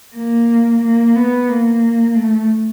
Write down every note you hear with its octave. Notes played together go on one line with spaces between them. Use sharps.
A#3
A#3
B3
A#3
A3